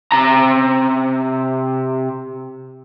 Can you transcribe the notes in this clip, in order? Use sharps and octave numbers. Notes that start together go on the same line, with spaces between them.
C3 A#5